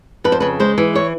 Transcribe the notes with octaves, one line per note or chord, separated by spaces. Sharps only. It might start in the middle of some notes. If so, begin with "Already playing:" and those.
F2 B4
C5
C#3 B4
G#3 C5
E3
C#5